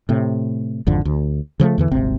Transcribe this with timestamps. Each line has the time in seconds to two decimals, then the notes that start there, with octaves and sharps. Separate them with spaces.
0.09 A2 C3
0.87 G#1 F2 D3
1.05 D2
1.60 C#3 F3 G3 A3
1.78 E2 D3 E3
1.91 D#1 G#1 C3 C4